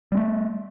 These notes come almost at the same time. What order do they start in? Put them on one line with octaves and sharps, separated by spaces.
G3 C4 A3